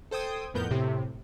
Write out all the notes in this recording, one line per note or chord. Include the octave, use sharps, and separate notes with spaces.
A4 C5 G5 D#6 G#6
F2 A2 B3 A#4 G6
A2 C3